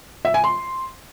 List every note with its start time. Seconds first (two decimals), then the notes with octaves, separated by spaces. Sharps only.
0.25 E5
0.34 G#5
0.44 C6